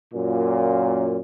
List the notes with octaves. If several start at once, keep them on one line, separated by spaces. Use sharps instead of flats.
F#2 A#2